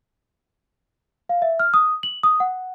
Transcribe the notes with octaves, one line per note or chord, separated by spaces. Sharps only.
F5
E5
F6
D#6
F#7
D#6
F#5